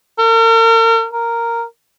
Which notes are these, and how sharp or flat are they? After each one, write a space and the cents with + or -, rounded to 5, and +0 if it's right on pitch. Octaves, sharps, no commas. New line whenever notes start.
A#4 -40
A#4 -5